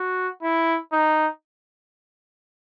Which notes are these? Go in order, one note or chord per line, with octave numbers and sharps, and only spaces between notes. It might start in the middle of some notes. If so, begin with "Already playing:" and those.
Already playing: F#4
E4
D#4